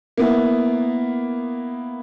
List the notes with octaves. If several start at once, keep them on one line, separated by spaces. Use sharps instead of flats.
A#3 B3 E4